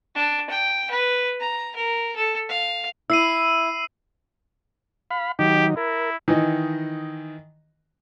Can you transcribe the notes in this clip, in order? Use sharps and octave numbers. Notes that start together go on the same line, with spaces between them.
D4
G5
B4
A#5
A#4
A4
F5
E4 E6 C7 D#7
F5 B5
D#3 F#3 D#4 G4
E4 A#4
D#3 E3 D#5